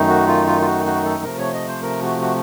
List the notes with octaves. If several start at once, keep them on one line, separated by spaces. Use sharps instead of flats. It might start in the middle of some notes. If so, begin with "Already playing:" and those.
Already playing: F#2 D#3 A3 D#4
F#4
F4
F4
F4
F#4
F#4
A4
C3 F3 A3 A#4
C#5
D#5
C5
A#4
F#4
F#4